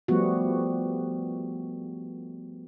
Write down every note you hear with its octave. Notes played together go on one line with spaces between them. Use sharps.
F3 G3 A3 B3 F#4